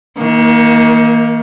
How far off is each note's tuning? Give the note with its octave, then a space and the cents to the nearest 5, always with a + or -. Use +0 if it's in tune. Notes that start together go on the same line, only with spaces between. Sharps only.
D#3 +35 A#3 +0